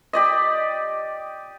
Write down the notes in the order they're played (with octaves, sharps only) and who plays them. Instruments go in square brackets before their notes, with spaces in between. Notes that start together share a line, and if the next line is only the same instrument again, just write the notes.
[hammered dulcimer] G4 D5 D#5